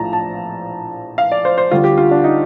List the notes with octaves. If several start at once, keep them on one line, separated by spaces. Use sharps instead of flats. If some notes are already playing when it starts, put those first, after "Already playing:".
Already playing: A#1 A2 F3 A5 A#5
A5
F5
D5
C5
C5
D2 D3 G3 F4
G4
F4
D4
D#4